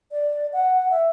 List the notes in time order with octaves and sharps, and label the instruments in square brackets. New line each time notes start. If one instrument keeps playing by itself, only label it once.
[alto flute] D5
F#5
E5